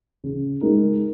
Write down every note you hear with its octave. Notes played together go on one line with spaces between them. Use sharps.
C#3
G#3 D#4 A#4